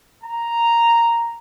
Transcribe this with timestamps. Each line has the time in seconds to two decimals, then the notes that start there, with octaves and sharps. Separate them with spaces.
0.23 A#5